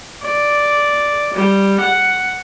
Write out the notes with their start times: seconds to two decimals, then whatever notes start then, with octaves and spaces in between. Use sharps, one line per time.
0.23 D5
1.34 G3
1.81 F#5